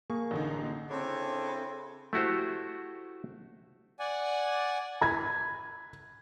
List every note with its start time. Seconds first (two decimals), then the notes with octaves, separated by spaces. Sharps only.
0.10 A#3 G#4 C#6
0.31 A1 D3 D#4
0.89 C#3 C4 D4 E4 A4 C#5
2.13 A3 E4 F#4 G4 C5
3.99 D5 F#5 G#5
5.01 B5 G#6